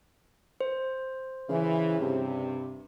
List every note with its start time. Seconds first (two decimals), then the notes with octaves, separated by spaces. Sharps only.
0.61 C5
1.49 C#3 E3
1.98 G2 C3